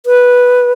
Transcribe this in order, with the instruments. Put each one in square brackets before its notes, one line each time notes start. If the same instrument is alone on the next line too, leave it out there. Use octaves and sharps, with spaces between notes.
[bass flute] B4